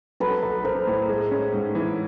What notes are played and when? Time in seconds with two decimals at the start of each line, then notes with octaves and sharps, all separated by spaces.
0.20 F#3 A4 B4
0.43 B1
0.64 B1 A#4 C5
0.87 A2
1.09 G#3
1.31 C#4
1.53 G#2
1.75 E3